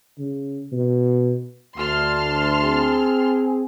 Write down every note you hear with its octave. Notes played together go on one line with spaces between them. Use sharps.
C#3
B2
D2 A5 C6 F6
C4 G#4